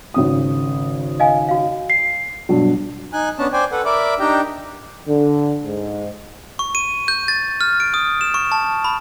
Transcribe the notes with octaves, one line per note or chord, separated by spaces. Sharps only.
G#1 C#3 D#6
D#5 F5 G#5
F#4 F5
C7
G2 B2 F#3
D#4 G#5 F#6
B3 C#4 D4 A5
C5 D5 G5 G#5
A4 B4 F#5
A#4 D5 E5 B5 D6
D4 D#4 G4 G5 A#5
D3
G#2
C#6
D#7
G6
A6
F6
D7
D#6
E7
C#6
A5
B5